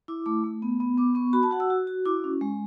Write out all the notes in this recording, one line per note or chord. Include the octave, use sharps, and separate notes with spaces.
E4 D6
A3 D6
A3
B3
B3
B3 D6
B3 C#6
F#4 B5
A5
F#4 F#5
E6
F#4
F#4
E4 D6
C#4
G#3